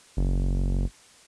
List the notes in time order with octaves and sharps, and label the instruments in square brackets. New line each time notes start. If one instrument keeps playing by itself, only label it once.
[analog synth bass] F#1